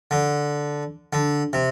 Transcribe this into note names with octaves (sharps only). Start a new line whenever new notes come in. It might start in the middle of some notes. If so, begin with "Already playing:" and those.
D3
D3
C3